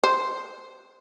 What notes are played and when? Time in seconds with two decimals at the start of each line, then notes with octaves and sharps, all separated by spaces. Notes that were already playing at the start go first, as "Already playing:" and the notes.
0.04 C5